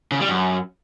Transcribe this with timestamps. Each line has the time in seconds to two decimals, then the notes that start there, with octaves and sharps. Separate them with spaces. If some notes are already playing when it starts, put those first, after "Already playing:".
0.12 C#3
0.20 G3
0.29 F#2